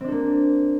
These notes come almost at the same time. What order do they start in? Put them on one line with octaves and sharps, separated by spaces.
C4 D4 A4 A#3